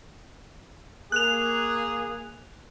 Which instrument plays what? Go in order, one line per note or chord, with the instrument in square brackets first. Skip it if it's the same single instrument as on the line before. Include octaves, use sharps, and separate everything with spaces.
[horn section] A#3 G#4 [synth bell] F#6 F7